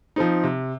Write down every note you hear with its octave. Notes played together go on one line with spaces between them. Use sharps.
F3 C4 D#4
C3